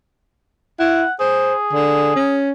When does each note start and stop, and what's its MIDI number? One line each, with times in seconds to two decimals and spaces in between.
0.80 1.04 64
0.80 1.13 78
1.20 2.40 68
1.20 1.55 72
1.73 2.11 50
2.16 2.52 61